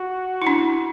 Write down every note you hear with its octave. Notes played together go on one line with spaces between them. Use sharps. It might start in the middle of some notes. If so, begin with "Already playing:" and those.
Already playing: F#4
E4
D4